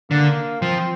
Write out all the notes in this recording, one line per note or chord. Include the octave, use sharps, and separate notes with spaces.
D3 A#3
F3 C4